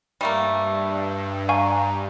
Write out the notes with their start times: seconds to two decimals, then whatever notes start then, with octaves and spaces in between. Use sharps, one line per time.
0.21 G2 G3 A3 A#3
1.49 F5 G#5 A#5 C#6